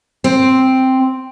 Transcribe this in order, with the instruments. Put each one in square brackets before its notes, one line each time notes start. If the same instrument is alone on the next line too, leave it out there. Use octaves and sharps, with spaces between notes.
[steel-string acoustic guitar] C4